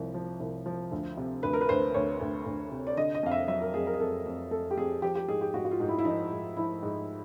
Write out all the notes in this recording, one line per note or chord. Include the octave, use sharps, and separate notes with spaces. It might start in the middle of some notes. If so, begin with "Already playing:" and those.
Already playing: C2 F3
F3
C2
F3
D2
C3
D2 B4
A#4
B4
D2 C5
D2 C#5
D2
D2
C3
D5
D3 D#5
D#5
F2 F5
E5
F#3 E5
A#4
F2 G#4
A#4
G#4
F2 A4
F2
F2 A4
G4
F2 G#4
F3 G4
G4
G#2 G#4
G4
G#2 F#4
F#4
F4
G#2
E4
E4
F3 D#4
G#2
F3 E4
G#2